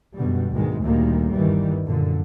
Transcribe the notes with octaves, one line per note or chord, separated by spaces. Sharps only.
F#2 B2 D3 G3
D2 G#2 B2 D#3 G#3
D2 A#2 D3 D#3 G3 A#3
G1 D#2 D#3 E3 G3
F#2 A#2 D3